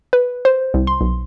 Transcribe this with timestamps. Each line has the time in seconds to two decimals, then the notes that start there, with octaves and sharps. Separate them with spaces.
0.13 B4
0.45 C5
0.74 C2
0.87 C6
1.01 B1